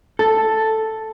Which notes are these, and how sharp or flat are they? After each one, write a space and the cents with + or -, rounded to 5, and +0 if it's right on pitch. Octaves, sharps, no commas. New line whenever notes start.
A4 +0